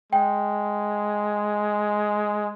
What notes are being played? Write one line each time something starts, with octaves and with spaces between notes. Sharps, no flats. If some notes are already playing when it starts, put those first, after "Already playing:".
G#3 G5